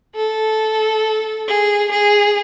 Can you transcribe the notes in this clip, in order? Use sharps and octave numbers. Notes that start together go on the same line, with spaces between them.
A4
G#4
G#4